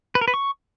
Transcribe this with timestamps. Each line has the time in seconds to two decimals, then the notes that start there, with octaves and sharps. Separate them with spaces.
0.15 B4
0.21 A#4
0.28 B4
0.34 C#6